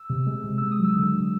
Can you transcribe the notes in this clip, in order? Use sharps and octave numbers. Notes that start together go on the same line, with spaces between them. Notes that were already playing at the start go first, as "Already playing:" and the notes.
Already playing: E6
C3
G#3
C3
G#3 E6
D#6
F#3
E6
D3
D3